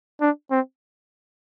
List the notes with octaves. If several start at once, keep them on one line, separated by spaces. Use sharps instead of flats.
D4
C4